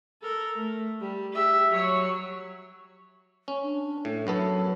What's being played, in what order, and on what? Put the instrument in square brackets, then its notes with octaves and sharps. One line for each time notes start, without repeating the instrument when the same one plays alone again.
[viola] A4 A#4
A3
G3 G4
G4 E5
F#3 C#5
[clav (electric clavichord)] C#4
[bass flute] D4
[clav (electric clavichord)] A2
[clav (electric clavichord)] F#2 B3 A4 [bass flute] F#3